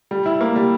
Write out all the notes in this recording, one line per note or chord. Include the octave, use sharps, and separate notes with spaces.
G3
E4
A#3
G3